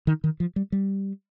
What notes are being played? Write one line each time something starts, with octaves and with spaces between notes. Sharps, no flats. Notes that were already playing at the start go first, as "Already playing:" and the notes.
D#3
D#3
F3
G3
G3